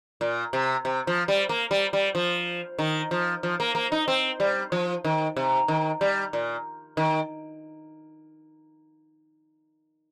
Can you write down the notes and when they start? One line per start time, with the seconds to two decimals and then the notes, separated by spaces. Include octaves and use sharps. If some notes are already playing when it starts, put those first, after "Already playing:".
0.21 A#2
0.53 C3
0.85 C3
1.07 F3
1.28 G3
1.49 A#3
1.71 G3
1.93 G3
2.15 F3
2.79 D#3
3.11 F3
3.43 F3
3.60 A#3
3.75 A#3
3.92 D#4
4.08 C4
4.40 G3
4.72 F3
5.05 D#3
5.36 C3
5.68 D#3
6.01 G3
6.33 A#2
6.97 D#3